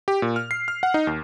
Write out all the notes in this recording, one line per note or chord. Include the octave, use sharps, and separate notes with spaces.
G4
A#2
F6
C7
F6
F#5
D#4
D#2